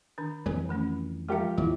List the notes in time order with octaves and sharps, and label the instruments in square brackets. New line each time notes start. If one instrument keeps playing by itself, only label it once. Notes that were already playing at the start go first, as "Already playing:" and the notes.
[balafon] D#3 D4
[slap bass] F2 E3 G3 [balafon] C4 G#4 A#4
[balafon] D#3 A3 C#4
[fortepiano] F3 G4 A#4 [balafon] G#3 E5
[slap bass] D#2 G#2 [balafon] G3 E4 F4